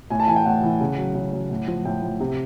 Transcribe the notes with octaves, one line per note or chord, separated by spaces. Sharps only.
A2 G#5
A5
E3 G#5
G5
A2 F#5
E3
C#3
F#3
C#3
F#3
A2
F3
A2 G5
F3
C3